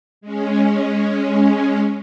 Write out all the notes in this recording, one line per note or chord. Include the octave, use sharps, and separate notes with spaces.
G#3 C#4